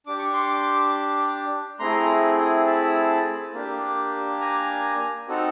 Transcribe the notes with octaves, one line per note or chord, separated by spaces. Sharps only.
D4 G4 D6
C#6
C6 D6
A3 C4 E4 G#4 A#5 C6
A5 B5
A#3 D4 G4
G#5 A#5
C4 D#4 F#4 A4